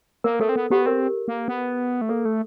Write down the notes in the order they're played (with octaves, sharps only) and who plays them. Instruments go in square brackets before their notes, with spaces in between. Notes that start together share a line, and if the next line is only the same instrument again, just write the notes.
[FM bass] A#3 [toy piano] A#4
[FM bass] A3 [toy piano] A4
[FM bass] C4
B3
[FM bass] B3 [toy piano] G4
[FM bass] C4 [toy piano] A#4
[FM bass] A#3
B3
A3
[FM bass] A#3 [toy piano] A4
[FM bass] A3